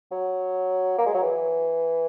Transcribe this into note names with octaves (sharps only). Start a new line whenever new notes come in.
F#3
A#3
G#3
F#3
E3